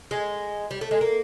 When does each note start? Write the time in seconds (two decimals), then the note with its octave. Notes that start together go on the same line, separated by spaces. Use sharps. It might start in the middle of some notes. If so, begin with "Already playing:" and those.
0.11 G#3
0.71 G3
0.81 A3
0.91 G#3
1.01 A#3